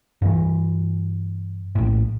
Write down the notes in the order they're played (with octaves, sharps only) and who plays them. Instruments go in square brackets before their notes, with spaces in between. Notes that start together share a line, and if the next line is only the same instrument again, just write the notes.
[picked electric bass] G2 E3
A#1 A2